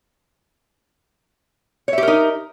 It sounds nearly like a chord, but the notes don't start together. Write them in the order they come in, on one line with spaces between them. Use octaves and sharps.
C#5 E5 G4 A#4 D#4